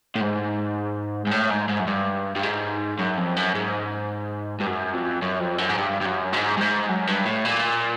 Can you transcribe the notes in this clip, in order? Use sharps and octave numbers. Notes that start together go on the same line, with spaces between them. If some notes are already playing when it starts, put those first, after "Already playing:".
A2
G#2
G#2
A2
G#2
G#2
F#2
G2
G2
G#2
F#2
F2
F#2
G#2
G2
F#2
F2
F#2
F2
F#2
G#2
G2
G2
F#2
G#2
G2
G#2
F#2
G2
A2
A#2